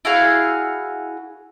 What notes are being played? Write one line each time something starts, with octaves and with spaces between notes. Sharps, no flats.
E4 F#4 G#4 F5